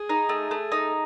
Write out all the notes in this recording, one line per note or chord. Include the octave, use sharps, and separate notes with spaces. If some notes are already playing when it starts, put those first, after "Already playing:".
Already playing: G#4
D#4
A3
A3
D#4